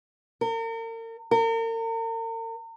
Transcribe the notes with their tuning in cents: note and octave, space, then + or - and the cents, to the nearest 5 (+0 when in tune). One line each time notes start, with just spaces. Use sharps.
A#4 -40
A#4 -40